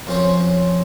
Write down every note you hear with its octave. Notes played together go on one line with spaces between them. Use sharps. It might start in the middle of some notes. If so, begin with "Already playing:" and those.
F2 C#4 C5 C#5